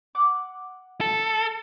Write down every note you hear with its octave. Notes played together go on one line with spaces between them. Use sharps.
F#5 D6
A4